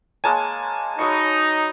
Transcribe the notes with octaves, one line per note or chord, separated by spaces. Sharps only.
G#3 A#3 C#5 G#5 A5
F#3 D#4 B5 C#6